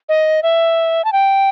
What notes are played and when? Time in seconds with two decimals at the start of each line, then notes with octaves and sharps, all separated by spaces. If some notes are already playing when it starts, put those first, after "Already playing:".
0.09 D#5
0.43 E5
1.04 A5
1.12 G5